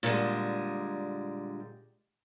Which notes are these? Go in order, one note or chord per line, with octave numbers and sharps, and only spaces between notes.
A#2 D3 G3 G#3